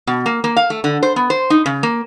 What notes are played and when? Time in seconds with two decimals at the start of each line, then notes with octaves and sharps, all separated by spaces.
0.07 B2
0.26 A#3
0.44 A#3
0.56 F5
0.70 A3
0.84 D3
1.03 C5
1.16 B3
1.30 C5
1.50 D#4
1.66 C#3
1.83 A#3